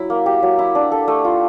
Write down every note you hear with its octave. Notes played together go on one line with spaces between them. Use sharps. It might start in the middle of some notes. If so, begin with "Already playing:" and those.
Already playing: F#3 E4
A#3
G4
F#3
E4
D4
A4
A3
F4